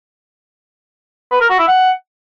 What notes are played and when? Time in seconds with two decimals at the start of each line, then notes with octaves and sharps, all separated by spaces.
1.32 B4
1.41 A#4
1.50 F#4
1.59 E4
1.68 F#5